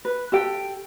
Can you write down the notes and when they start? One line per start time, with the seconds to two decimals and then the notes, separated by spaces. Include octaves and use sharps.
0.05 B4
0.32 G4 A4 G5